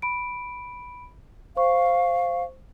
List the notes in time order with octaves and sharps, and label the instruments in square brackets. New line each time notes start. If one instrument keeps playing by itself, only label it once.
[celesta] B5 D7
[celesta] C5 C#6 [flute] F5